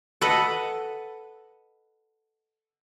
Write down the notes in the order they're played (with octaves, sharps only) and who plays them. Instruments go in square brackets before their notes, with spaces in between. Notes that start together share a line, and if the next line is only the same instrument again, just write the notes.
[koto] A4 B4 D#5 F#5